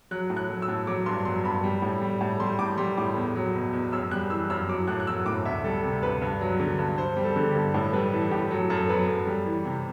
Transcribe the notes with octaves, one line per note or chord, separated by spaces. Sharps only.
F#3 F#6
A2
F#6
F#3
E6
A2
F#3 D6
G2 C6
F#3 C6
G2 B5
G3
A2
G3
A2
G3 C6
A2 D6
G3 C6
A2 D6
E2
F#3
B2
E2
F#2 E6
G3 F#6
E3 E6
F#2 E6
F#3 D6
A2 F#6
F#6
F#3 E6
A2 D6
D2 E5
G3 A4
C3
D2 B4
G2
F#3
D3
G2
G2 C5
G3
A4
D3
G4
G2
A2 A4
G3 B4
E3 A4
A2 G4
F#3 A4
F#2 A4
F#3 B4
F#2 A4
G3
E3
C3